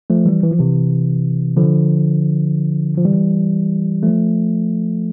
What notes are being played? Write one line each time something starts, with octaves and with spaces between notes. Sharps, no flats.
F3 A3
E3 G3
E3
F3
C3 E3
D3 F3
F3
E3 G3
F3 A3